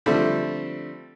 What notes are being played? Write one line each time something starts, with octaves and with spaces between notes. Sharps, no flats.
D3 F3 G3 A3 C4